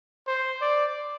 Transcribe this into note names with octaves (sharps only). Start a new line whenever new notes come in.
C5
D5